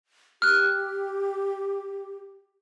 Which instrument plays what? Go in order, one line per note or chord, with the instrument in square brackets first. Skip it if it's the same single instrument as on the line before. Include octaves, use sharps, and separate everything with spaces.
[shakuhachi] G4 [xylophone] F6 F#6